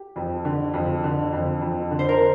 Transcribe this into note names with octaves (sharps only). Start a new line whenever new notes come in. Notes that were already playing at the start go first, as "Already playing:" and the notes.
Already playing: G4
F2
D3
F2
D3
F2
F2
D3
C5
A#4